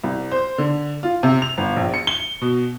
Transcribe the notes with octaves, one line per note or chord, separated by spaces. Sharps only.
C2
C5
D3
F4
C3
F7
G1
A#1
C#7
G7
B2